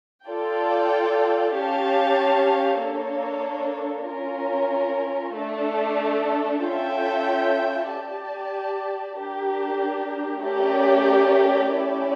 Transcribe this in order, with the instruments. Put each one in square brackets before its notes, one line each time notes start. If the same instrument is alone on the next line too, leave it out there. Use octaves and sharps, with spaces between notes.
[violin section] F4 A4 D5 G5
C#4 G4 C#5 F5 A5
A#3 D4 A4 C#5
C#4 F4 A#4
A3 D4 A4
C#4 F4 A4 E5 G5
G4 D5 A5
D4 G4 A#4
A3 C#4 G4 A#4 D5
A3 C#4 E4 G4 D5